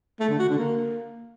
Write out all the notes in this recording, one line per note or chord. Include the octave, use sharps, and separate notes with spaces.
A3
D3
F#4
D3
A#3